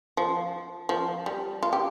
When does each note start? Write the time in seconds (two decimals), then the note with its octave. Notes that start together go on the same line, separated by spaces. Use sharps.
0.17 F3
0.89 F3
1.26 G3
1.63 F4
1.73 G4